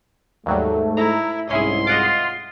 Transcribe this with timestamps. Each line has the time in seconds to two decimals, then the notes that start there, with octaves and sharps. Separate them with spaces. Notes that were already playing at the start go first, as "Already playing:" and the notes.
0.46 D#2 G#2 F#3 G3 A3
0.97 E4 A#5
1.51 C2 G#2 C#4 E4 G#4 C6
1.87 F4 D#5 F#5 D6